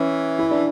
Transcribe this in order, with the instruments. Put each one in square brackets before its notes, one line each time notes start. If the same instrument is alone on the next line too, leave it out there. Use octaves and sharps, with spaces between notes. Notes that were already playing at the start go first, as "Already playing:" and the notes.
Already playing: [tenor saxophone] E3 [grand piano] C#4
[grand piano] E4
D4